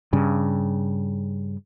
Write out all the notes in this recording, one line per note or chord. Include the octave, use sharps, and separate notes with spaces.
G2 C#3